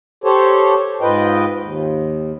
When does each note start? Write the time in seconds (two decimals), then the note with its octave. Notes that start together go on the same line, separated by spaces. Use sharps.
0.24 G4 A4 C5 C#5
1.01 G#2 F4 B4 D#5 G5
1.59 D#2